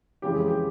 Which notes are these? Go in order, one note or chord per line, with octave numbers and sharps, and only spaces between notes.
F2 C#3 E3 G#3 G4
G#4
G4